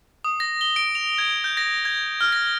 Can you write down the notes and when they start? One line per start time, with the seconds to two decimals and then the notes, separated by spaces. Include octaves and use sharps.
0.24 D#6
0.40 A#6
0.61 G7
0.76 D7
0.95 F7
1.18 G#6
1.44 G6
1.57 A#6
1.85 G#6
2.21 F6
2.32 A#6